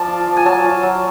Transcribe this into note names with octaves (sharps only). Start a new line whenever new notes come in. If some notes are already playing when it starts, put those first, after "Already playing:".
Already playing: F3 D5 A5
F4
F3
G#5
F#3 A5
F4
F#3